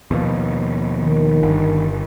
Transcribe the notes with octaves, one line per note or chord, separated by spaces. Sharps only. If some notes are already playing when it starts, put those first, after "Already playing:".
D#2 B2 F3
D#3
G1